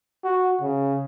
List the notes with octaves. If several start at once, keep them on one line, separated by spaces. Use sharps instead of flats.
F#4
C#3